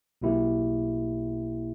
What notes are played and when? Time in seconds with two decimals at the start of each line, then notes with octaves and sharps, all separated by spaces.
0.22 B1 B2 A#3 E4 G4